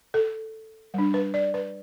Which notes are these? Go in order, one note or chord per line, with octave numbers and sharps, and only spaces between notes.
A4
G3 D4
B4
D5
B4